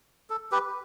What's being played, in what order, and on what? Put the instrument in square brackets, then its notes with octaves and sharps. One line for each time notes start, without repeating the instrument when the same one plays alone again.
[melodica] A4
G4 B4